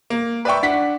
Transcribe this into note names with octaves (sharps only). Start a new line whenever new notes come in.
A#3
B4 D5 E5 G5 C#6
D4 F#5 B6